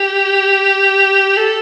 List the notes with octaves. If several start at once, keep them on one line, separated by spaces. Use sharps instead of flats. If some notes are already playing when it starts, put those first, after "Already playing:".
Already playing: G4
A4